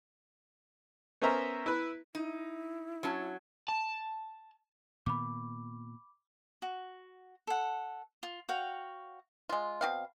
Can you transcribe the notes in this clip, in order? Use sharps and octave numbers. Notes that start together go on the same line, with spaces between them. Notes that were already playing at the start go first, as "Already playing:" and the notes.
B3 C#4 A#4 C5 E5 A#5
E4 B4
D#4 E4
F#3 C#4 A5
A5
A#2 D#3 B3 B5 D6
F#4
A4 F#5
F4
F#4 C#5 F5 G5
G#3 F4
B2 C4 F5